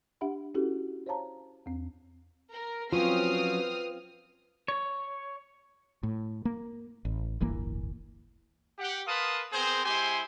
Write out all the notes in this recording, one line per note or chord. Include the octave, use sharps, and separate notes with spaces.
D4 G4 E5 F#5 B5
C#4 E4 F#4 G4 A4
C5 C#5 F5 A5 A#5
E2 C4
A#4
F3 F#3 C4 C#4 F4 B4 D#6 F6
C#5
A2
A#3
A1
D1 G1 E3 A#3
G4 F#5
A#4 B4 F5 A5 C6 D#6
B3 C4 G#4 A#4 C5
G#3 E4 G4 C5 G#5 C6